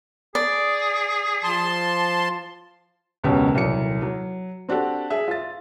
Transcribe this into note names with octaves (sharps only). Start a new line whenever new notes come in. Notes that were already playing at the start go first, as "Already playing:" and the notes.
G#4 D5
F3 A5 C6
E1 C#2 F#2 B2 C#4 G4
D#1 C2 F#3 C#7
F#3
C4 D4 F#4 G4 A4
G#4 E5
F4 A6